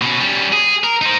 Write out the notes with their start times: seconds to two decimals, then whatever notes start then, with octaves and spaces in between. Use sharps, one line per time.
0.02 B2 C#4
0.20 G3 C#4
0.53 G#4
0.84 A#4
1.02 D#4 C5